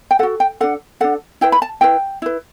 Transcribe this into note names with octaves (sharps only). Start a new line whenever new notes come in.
G5
F#4 A4 F#5
G5
D4 A4 F#5
D4 A4 F#5
E4 B4 G5
B5
A5
E4 B4 G5
E4 B4